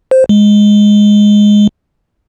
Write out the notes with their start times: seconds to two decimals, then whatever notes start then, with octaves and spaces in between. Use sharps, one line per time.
0.11 C5
0.29 G#3